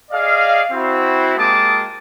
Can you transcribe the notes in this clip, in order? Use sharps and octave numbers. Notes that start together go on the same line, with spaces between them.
G#4 D5 D#5 F5
C4 E4 F#4
G#3 A#3 G4 A5 D6 D#6